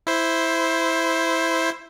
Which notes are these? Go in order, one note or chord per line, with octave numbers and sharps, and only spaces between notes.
E4 C5